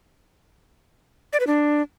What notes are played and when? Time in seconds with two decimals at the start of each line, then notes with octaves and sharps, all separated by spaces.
1.33 D5
1.40 B4
1.47 D4